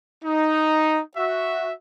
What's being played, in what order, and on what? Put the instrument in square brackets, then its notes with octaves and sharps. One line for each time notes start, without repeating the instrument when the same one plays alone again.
[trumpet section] D#4
F#4 E5